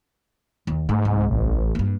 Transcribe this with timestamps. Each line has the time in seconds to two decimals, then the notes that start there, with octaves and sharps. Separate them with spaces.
0.67 D#2
0.89 G#2 A3
1.05 C2
1.30 A1
1.75 G2 A#3